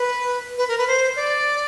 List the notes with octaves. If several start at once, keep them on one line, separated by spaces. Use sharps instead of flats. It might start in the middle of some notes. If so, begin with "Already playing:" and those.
Already playing: B4
B4
A#4
B4
C5
D5